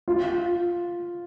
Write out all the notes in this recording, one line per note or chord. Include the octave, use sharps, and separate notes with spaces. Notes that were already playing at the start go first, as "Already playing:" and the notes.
F4